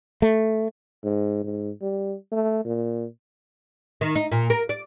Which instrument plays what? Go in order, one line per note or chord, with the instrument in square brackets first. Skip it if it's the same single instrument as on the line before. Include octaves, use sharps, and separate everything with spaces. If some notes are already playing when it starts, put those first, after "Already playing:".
[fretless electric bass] A3
[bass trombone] G#2
G#2
G3
A3
A#2
[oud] D#3
D#4
A#2
A#4
D5